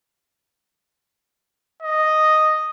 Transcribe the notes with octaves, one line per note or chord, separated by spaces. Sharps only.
D#5